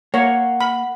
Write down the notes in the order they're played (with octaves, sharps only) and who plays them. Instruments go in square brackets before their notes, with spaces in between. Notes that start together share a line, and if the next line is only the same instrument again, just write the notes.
[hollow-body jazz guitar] A#3 [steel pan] C#5 [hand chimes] F#5
[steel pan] B5